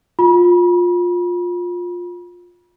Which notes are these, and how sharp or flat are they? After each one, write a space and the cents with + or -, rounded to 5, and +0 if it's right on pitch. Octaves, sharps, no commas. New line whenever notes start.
F4 +20 B5 -40